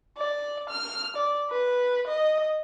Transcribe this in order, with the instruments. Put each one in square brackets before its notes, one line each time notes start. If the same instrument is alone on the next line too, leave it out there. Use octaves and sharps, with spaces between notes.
[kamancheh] D5
F6
D5
B4
D#5